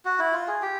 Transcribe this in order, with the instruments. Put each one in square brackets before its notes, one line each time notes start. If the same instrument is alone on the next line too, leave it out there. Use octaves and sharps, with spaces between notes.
[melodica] F#4
E4
F4
G#4
G4